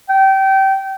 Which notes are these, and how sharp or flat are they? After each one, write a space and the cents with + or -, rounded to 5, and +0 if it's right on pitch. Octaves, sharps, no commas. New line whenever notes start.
G5 -25